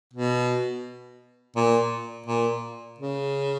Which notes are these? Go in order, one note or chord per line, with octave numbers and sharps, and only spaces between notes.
B2
A#2
A#2
C#3